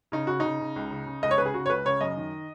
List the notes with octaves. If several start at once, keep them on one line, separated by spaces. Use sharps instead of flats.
C#3 D#4
C#3 F#4
C#3 D#4
C#3
C#2
C#3
C#3
C#2 D#5
C#5
C#3 B4
G#4
C#3 F#4
C#5
C#2 B4
C#3 C#5
F#2 D#5
D#3